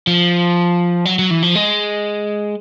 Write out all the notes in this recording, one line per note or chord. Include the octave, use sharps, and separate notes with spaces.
F3
F#3
F#3
E3
F3
G#3